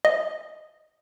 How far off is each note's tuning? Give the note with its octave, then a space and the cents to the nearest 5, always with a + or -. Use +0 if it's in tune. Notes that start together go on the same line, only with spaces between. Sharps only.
D#5 +0